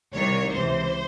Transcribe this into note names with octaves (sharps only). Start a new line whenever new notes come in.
C2 C3 D#3 C#5
C#2 C3 E3 C5